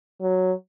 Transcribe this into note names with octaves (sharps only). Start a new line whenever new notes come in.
F#3